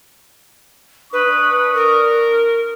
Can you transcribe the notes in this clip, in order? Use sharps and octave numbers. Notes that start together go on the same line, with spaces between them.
D4 B4 C#6 D#6
A#4